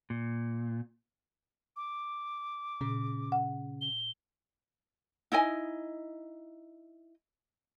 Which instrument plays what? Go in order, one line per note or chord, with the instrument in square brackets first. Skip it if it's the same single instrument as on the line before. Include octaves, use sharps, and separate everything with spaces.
[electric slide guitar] A#2
[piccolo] D6
[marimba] A#2 [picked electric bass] C#3
[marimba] F#5
[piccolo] G7
[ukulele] D#4 E4 D#5 G#5